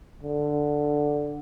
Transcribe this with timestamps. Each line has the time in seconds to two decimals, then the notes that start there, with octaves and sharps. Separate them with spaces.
0.23 D3